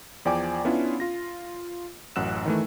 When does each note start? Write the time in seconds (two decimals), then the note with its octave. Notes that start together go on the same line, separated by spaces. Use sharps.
0.25 E2 F3 D5 G5 G#5 D6
0.65 B3 C#4 D4 E4 F4
1.00 F4 A#6
2.16 A1 F#2 F#5 E6 F#6 E7
2.46 D#3 E3 A3